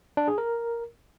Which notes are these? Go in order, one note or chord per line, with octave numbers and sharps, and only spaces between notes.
D4
G#4
A#4